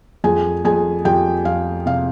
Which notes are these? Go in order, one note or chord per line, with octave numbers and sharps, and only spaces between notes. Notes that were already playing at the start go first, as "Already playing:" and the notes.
F2 G#4 G#5
F2 G#4 G#5
F2 G4 G5
F2 F5
C3 F5